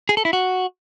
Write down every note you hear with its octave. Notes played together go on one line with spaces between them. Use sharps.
G#4
A4
E4
F#4